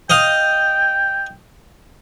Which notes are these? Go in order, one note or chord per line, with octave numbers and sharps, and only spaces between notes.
D#5 F5 G5